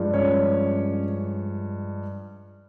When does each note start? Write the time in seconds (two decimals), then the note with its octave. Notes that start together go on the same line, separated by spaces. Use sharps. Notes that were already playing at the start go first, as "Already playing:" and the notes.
Already playing: G2 F3 G#3
0.13 C#4 C#5